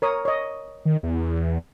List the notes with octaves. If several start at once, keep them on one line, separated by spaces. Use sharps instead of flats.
A#4 C#5 D#6
C#5 D#5
D#3
E2